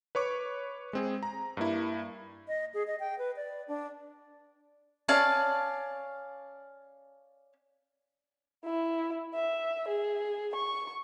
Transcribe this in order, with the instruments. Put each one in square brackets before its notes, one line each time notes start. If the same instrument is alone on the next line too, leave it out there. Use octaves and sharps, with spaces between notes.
[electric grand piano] B4 C#5 C#6 D6
G#3 C4 G#4
A#5
G2 A#3 E4
[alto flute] D#5
G#4
D#5
G5
B4
D5
D4
[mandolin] C#4 D5 F5 A5
[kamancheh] E4
E5
G#4
C#6